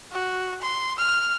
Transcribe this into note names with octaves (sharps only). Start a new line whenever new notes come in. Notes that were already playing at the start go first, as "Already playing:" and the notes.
F#4
C6
F6